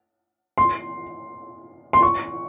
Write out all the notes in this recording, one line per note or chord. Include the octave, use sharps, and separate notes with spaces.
C6
C6
C#6